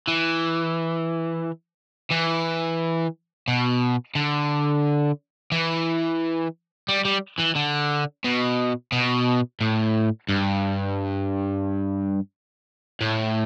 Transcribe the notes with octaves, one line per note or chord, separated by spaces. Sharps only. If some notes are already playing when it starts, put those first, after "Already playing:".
E3
E3
B2
D3
E3
G3
G3
E3
D3
B2
B2
A2
G2
A2